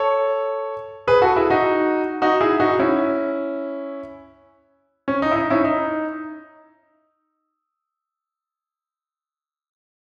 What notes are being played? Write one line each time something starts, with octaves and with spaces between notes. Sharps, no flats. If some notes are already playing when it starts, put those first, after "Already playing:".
Already playing: A4 C#5
G#4 B4
F#4 A4
E4 G#4
D#4 F#4
D#4 F#4
E4 G#4
D#4 F#4
C#4 E4
C#4
D#4
E4
D#4
C#4 E4
D#4